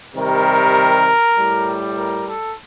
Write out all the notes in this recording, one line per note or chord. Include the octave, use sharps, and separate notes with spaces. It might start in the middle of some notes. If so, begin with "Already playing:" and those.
C3 D#3 G3 A#4
A2 G3
A#4
A4